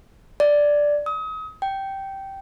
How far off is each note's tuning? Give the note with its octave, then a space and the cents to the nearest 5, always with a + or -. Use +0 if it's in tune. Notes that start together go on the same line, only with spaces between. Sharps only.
D5 +0
D#6 +35
G5 -10